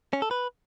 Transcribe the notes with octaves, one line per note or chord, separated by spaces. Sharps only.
C#4
A4
B4